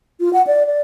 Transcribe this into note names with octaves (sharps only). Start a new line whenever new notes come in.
F4
F#5
D5
D5